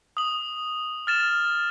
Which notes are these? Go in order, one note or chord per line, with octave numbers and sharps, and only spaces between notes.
D#6 F#7
F6 A6 E7